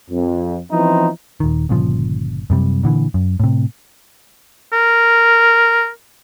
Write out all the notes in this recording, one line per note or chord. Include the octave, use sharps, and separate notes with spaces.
F2
E3 F3 B3 C4 D#4 E4
D#1 D#3
G1 A#2 C#3 F3
F#2 C3 G3
A#2 D3 E3
F#2
A2 C3
A#4